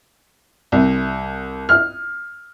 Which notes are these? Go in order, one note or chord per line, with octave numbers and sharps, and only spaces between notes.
C2
F6